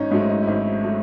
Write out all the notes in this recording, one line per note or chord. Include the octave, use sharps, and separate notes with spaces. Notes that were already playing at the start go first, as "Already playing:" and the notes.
Already playing: G#1 C#4 D#4
G#2 F#3 A3 C#4
D#4
E4
G#1 D#4
F#3 A3